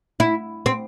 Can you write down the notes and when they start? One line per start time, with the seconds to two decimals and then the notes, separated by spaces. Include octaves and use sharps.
0.20 E4
0.66 C4